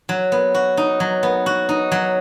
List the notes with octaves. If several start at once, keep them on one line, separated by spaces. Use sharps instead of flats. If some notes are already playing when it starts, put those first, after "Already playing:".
F#3
B3
F#4
D#4
F#3
B3
F#4
D#4
F#3